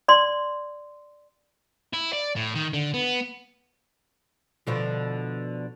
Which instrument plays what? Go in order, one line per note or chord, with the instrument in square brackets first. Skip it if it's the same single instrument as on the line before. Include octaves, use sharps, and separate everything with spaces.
[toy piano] D5 C6
[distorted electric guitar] E4
D5
A2
D#3
D3
B3
[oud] B2 D3 F3